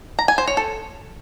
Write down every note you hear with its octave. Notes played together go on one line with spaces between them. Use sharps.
A#5
G#5
C5
C#5
A4